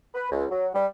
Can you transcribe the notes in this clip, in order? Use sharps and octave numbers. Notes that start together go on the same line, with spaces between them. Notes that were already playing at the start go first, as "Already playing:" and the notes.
B4
C#2
F#3
G3